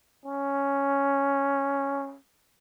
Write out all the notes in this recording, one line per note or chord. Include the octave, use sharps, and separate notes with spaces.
C#4